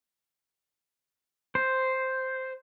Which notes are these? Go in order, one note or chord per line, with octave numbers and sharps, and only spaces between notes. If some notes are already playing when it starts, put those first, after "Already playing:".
C5